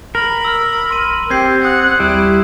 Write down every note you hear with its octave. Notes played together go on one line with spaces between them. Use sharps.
A#4 B5 F6
E6 F6
A#1 C6 D#7
C4 G4 G6 G#6 C7
F#5 D#6 F#6 G#6
D#2 G3 E4